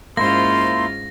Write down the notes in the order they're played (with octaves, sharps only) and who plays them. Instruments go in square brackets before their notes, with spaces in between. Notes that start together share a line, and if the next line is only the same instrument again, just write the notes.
[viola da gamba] G#2 C#4 F4 [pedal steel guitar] A#3 E4 C5 [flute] C6 [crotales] A#6